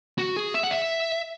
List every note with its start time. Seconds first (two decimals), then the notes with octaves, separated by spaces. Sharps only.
0.18 F#4
0.36 G#4
0.54 E5
0.63 F#5
0.71 E5